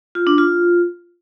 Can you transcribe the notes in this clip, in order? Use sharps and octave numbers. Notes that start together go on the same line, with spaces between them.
F4
D4
F4